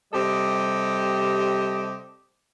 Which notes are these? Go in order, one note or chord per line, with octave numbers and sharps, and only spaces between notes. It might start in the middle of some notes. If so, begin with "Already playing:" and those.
C3 G3 G4 A4 D#5